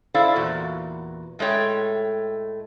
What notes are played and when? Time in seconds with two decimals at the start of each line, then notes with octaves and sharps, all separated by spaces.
0.14 E4 A4 C5 D5 F5
0.35 E2 A#2 F#4
1.39 A2 G#3 A3 C#5 G5